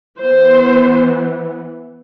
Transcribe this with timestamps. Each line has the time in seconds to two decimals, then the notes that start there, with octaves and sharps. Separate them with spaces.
0.19 E3 B3 C5